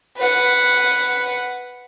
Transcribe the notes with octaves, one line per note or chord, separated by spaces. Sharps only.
B4 F#5